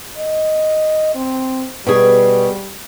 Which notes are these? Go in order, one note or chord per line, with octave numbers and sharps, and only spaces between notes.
D#5
C4
B2 G3 G#4